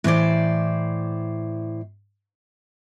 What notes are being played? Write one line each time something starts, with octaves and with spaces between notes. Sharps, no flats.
A2 E3 C5 D5